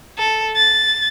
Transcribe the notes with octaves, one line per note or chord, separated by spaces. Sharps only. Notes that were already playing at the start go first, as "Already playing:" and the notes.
A4
A6